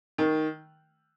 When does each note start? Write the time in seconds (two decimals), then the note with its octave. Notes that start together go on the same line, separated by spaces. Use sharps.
0.18 D#3